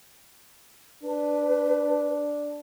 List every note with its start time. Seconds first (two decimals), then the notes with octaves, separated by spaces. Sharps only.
1.04 D4 B4